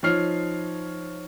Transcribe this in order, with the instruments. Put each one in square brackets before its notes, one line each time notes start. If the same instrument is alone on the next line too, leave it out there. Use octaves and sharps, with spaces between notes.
[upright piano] F3 D#4 C#5 F6 C7